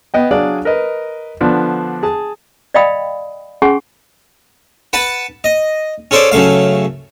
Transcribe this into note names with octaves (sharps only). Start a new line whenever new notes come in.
B3 D#5 G5
F#3 D4 G#4 D5 F5
A#4 B4 D#5
D3 F3 B3 D4 F4
G#4 A5
D5 D#5 F5 G5 B5 D#6
C#4 G#4 F#5 G#5 C6 C#6
B4 F#5 A5
D#5
C#4 G#4 A4 C5 D5
F#2 C#3 A3 F5